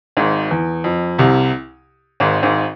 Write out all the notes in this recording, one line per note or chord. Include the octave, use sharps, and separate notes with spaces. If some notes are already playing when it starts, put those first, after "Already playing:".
G#1 G#2
E2
F2
C2 C3
G#1 G#2
G#1 G#2